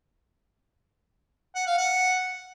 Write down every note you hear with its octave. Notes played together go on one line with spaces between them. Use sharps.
F#5
F5
F#5